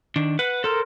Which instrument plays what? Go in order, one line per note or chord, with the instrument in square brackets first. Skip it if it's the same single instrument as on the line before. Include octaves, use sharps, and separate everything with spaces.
[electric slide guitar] D#3 D4
[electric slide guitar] B4 [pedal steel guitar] F#5
[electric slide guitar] A4 [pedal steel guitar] A#4 C5